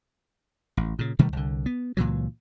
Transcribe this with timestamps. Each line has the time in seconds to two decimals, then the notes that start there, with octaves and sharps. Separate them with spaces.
0.77 A1
0.99 A#2 C#3
1.19 B2 D#3 G3 A3
1.33 C2 D3
1.66 B3
1.97 C#2 A#2 E3 F#3